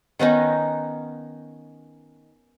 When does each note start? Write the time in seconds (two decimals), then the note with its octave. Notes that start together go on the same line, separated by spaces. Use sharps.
0.19 D#3 B3 C#4 D#4